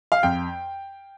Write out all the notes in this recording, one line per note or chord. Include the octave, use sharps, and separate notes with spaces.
F5
F2 G5